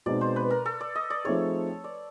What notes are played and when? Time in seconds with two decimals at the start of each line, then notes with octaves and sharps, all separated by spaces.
0.06 B2 G#3 C4 D#4 D5
0.21 C5
0.36 B4
0.50 A#4
0.66 A4
0.81 D5
0.95 D#5
1.10 D5
1.24 F3 A3 C4 D#4 G#4 C#5
1.84 D5